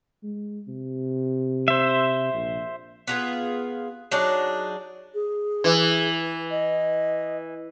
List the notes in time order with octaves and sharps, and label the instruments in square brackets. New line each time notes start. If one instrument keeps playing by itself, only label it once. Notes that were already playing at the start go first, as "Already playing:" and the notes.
[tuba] G#3
C3
[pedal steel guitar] C5 E5
[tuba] A#1
[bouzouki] B3 F4 G#4
F#3 D4 D#4 G#4
[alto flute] G#4
[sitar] E3
[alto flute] D#5